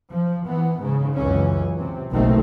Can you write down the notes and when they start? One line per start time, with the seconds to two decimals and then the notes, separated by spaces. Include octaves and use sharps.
0.12 F3
0.47 E3 B3
0.80 G#2 C#3
1.16 C#2 F#2 E3 C#4
1.79 C3
2.12 F#1 B1 D#3 A3 C4